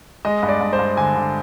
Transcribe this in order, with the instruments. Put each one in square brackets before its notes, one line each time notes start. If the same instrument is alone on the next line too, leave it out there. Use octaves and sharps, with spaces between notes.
[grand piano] G#3 D#5
G2
D5
G2
C5
G2
D3 G#5
D3